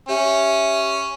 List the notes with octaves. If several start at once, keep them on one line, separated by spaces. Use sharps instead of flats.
C#4 G4 E5